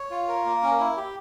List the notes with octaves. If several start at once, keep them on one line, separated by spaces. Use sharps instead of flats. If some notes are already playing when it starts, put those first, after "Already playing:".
Already playing: C#5
F4
A#4
A#3
C#4
E4
G4